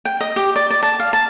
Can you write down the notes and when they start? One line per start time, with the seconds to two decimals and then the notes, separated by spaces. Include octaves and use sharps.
0.05 G5
0.21 D#5
0.36 G4
0.56 D5
0.71 D5
0.83 A5
1.00 F5
1.13 A5